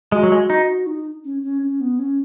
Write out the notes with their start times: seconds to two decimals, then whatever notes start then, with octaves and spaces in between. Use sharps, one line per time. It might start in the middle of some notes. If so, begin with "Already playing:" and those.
0.12 G#3 F#4
0.23 F#3
0.32 G#3
0.50 D#4
0.86 D#4
1.25 C#4
1.43 C#4
1.62 C#4
1.81 B3
1.99 C#4